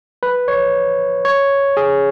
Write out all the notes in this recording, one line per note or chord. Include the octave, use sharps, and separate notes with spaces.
B4
C#5
C#5
G#4